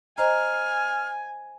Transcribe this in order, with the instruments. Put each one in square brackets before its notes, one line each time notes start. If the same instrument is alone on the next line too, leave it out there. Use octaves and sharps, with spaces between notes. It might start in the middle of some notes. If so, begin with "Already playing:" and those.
[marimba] C5 D#5 A#5 [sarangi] G#5 [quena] F6